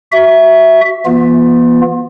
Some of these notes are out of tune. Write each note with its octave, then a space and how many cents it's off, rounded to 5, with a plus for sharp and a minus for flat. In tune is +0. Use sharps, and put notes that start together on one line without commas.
F#4 +15 E5 +0
E3 +30 B3 -40 F4 +25